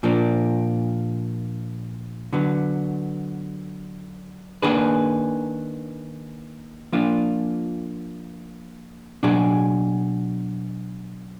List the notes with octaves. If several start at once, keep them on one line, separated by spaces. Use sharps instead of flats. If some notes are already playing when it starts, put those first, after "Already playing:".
A#2 F3 A#3 D4
D3 F#3 B3
D#3 A#3 D4 G#4 B4
F3 A#3 D4 F4
B2 F#3 D4 G#4